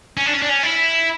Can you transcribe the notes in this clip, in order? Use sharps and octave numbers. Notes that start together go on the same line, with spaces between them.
C#4
D4
C#4
D4
C#4
E4